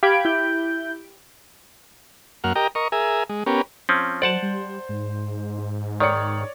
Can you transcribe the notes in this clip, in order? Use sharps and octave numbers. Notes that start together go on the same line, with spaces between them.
G4 F5 B5 G#6 D7
E4 G6
F#2 A#3 F#5 F6
G4 A#4 D#5 G5 A#5
A#4 D#5 C#6
G#4 A#4 E5 G#5
G#3
B3 C#4 G4 A#4
F3 C4 C#4
F#3 C5 D5 F#5 A5
G3
G#2
D#3 C#5 D5 C#7